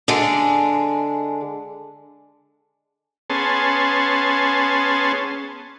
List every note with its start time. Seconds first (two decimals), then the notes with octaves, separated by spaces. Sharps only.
0.08 D3 G#3
3.30 B3 C#4 G#4 A5 C6